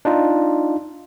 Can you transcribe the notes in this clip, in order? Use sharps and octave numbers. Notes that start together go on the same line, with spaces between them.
D4 D#4 F4